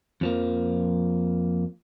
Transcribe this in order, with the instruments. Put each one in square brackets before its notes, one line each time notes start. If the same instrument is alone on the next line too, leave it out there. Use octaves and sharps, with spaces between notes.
[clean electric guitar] F2 F3 A#3